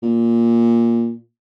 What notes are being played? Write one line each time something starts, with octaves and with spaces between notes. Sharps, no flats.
A#2